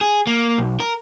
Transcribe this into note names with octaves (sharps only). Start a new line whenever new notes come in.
G#4
A#3
B1
A#4